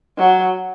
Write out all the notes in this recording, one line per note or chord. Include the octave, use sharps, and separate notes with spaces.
F#3